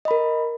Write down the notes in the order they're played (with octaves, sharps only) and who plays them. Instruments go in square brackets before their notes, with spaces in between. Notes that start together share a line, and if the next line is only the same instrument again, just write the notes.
[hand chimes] D#5
B5
A#4